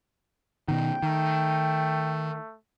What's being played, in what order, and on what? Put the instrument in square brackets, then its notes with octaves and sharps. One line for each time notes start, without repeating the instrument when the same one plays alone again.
[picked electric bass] B2 D#3 [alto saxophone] G5
[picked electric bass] D#3 [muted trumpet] A3